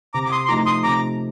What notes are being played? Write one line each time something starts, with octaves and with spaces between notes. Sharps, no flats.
C3 A#5 D6
D6
C6 D#6
C6
F3 A3 D#4 A#5 D6
C6 D#6
C3 A#5 D6